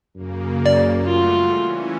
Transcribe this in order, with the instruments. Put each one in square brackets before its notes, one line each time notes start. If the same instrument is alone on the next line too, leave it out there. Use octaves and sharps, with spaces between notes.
[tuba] F#2 [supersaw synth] C#3 A#3
[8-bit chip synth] D5
[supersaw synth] G3 A3 F#4 [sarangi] F4
[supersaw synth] E3 C#4